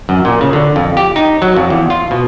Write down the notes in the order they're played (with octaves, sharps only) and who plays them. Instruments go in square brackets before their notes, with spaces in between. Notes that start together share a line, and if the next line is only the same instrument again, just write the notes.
[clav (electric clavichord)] F#2
A#2
C#3
D3
F2
G4
D#4
F#3
F2
E2
F4
B2